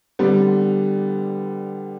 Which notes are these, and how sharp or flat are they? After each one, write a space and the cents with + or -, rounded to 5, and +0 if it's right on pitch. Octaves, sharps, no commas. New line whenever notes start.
D3 +10 G3 +0 B3 +20